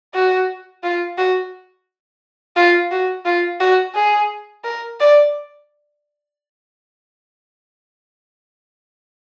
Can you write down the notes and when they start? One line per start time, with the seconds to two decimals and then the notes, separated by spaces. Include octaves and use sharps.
0.14 F#4
0.83 F4
1.18 F#4
2.56 F4
2.91 F#4
3.25 F4
3.60 F#4
3.95 G#4
4.64 A#4
5.00 D5